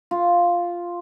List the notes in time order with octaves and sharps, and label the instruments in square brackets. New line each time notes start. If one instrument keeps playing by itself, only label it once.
[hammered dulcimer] F4